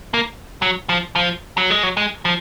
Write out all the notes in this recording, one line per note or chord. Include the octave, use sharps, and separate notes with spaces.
A#3
F#3
F3
F3
F#3
G#3
F#3
G#3
F3